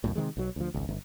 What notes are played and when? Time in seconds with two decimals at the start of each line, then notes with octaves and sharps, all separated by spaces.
0.04 C2 F#2 A2
0.15 C3 D#3 F#3 G#3
0.37 B1 F#3
0.56 D2 F3
0.74 G#1 C#2
0.89 G1